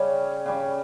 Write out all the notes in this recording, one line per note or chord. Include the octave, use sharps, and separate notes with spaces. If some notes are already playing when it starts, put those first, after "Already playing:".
Already playing: C#3 G3 C#4
C#3 G3 C#4